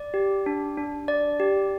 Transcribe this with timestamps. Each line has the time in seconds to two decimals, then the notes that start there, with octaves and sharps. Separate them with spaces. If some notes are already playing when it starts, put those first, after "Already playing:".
Already playing: D5
0.14 G4
0.46 D4
0.78 D4
1.08 D5
1.40 G4